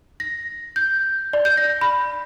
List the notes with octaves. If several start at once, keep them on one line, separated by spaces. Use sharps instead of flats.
A#6
G6
D5
G6
A#6
B5